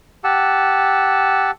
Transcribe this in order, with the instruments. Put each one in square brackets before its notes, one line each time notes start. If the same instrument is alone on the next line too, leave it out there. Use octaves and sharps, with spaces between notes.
[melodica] G4 F#5 A5 E6